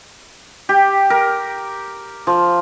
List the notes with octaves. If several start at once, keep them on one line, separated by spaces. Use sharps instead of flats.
G4
A#4
F3